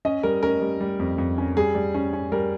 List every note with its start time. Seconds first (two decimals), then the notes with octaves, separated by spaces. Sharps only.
0.05 C#4 D#5
0.23 G3 A#4
0.43 C#4 A#4
0.62 G3
0.80 G3
0.99 F2
1.18 F2
1.38 C#4
1.57 G3 G#4
1.75 G3
1.94 C#4
2.13 C#4
2.32 G3 A#4